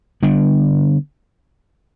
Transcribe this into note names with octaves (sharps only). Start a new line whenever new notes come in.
D3 G3 B3 D4